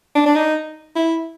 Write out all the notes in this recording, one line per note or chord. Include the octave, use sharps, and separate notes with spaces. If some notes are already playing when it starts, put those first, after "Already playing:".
D4
D4
D#4
E4